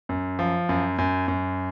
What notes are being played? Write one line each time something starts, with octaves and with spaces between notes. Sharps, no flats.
F#2
F3
F#2
F#2
F#2